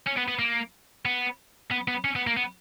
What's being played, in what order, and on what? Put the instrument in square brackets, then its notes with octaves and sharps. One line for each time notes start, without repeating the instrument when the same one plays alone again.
[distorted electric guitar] C#4
B3
B3
A#3
B3
B3
B3
C#4
B3
A#3
B3